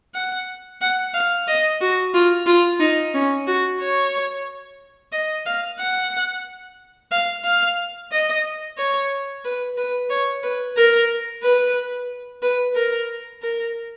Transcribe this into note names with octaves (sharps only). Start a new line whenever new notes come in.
F#5
F#5
F5
D#5
F#4
F4
F4
D#4
C#4
F#4
C#5
D#5
F5
F#5
F5
F5
D#5
C#5
B4
B4
C#5
B4
A#4
B4
B4
A#4
A#4